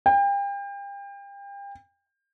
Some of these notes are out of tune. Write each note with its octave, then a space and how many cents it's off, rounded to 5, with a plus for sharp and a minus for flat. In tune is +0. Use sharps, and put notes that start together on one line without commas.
G5 +35